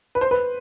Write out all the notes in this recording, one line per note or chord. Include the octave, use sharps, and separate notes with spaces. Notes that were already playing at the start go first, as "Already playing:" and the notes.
B4
C5
B4